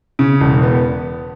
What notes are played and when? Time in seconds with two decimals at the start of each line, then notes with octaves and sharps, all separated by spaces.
0.19 C#3
0.41 E1
0.62 B3